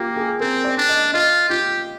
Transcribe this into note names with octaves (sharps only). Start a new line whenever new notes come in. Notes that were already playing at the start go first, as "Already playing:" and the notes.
Already playing: A#3 F4 G4
G#4
C4 A#4
D5
D4
D#5
F4 D#5
F4 G4